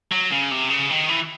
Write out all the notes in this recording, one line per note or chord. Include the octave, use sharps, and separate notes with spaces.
F#3
C#3
C3
C#3
D#3
E3